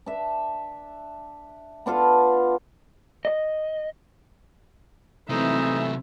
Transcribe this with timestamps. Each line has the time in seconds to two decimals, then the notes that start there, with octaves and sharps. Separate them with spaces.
0.06 D4 E5
1.86 B3 D4 F4 A4
3.25 D#5
5.29 C3 E3 F#3 A3 C4 D#4 E5